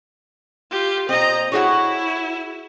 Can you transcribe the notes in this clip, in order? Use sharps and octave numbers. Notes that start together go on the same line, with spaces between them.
F4 G4
A#2 C4 D#5 A#5
E4 F#4 G#4 C#5